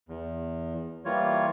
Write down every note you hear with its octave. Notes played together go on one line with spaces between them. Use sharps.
E2
E3 G3 A#3 F4 C#5